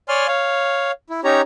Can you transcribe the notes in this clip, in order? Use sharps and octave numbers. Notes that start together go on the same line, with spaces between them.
C#5 D5 G#5 C6 F6
C#5 F5
E4
C#4 D#4 G4 C#5 A#5